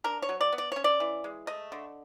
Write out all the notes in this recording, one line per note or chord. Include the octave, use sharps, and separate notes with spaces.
D4 A#4
C#5
F#3
D5
B3
D5
C#4 C#5
D5
E3
G#3
A3 D#5
D3